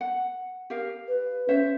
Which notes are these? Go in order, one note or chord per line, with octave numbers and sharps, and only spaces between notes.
F#5
G4 A#4 F5
B4
C#4 C5 C#5 E5